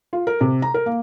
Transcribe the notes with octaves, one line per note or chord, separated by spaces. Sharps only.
F4
A#4
C3
A#5
A#4
A#3